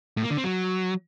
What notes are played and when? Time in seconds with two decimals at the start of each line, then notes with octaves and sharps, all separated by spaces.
0.17 A2
0.24 A#3
0.30 D3
0.37 C4
0.44 F#3